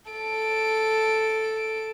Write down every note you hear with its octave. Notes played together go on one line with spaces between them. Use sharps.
A4 D7